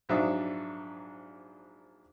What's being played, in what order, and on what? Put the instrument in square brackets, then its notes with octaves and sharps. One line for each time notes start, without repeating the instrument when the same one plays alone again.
[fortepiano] A#1 G#2 F#3 D4 E5 D#6